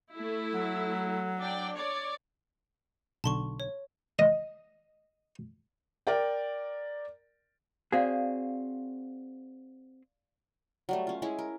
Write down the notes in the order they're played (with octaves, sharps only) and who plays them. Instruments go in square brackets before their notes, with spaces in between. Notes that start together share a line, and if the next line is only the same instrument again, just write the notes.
[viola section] A3 E4
[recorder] F#3
[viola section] D4 D5 G5
C#5 D5
[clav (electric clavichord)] B1 D3 [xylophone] A5 C6 C#6
[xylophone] C#5
[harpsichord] D#5
[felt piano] A#4 D5 G5
[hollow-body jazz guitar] C4 F#4 G#4 [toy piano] D5 F5 F#5
[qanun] F#3 G3 A3
C#4 F4
G#3 C#4 E4 G#4
A#4